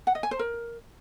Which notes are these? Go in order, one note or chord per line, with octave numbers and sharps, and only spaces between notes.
F#5
D#5
G#5
C5
A#4